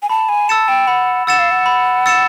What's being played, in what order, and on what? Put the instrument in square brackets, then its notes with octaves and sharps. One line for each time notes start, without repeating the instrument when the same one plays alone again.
[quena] G#5
[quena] A5 [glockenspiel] B5
[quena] G#5
[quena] A5 [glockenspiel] E6 A6 C#7 E7
[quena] G5
[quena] F#5 [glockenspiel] B5
[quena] F#5 [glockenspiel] E6 A6 C#7 E7
[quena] F5
F#5
[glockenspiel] B5
E6 A6 C#7 E7